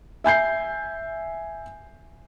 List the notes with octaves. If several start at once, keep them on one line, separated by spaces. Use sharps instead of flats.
E5 G#5 G6 C7